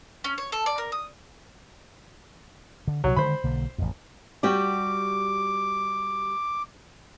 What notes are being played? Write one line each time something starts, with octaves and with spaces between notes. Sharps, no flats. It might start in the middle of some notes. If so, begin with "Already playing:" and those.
C#4
C#5
A4
D5
A#4
D#6
D3
C2 B2 F#3
D3 D#3 G#3 C5 B5
B1 D3 A#3
A1 F2
G3 F#4 G4 D6